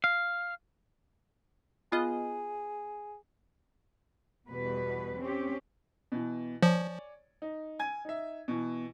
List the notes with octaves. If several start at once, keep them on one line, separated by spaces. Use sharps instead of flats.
F5
B3 F4 G#4 D#5
E2 B2 G3 B4
C4 C#4 G4
B2 E3
F3 C#5 D5 G#5
D#4
G#5 G#6
D#4 E5
B2 E3